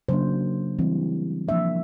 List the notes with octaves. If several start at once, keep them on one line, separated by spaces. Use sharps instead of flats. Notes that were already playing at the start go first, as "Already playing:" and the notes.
C#3 F#3 A#3 D4 C5
E3 G3 C4
F3 A#3 D4 E5